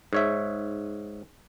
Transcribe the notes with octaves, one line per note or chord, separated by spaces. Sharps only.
G#2 C#5 E5